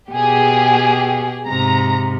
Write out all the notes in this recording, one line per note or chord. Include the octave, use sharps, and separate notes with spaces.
B2 G4 G#4
G#2 C3 A#5